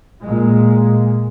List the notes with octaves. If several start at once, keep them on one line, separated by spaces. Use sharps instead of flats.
A#2 G#3